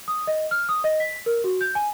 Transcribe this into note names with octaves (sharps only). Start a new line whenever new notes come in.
D#6
D#5
F6
D#6
D#5
B6
A#4
F#4
G6
G#5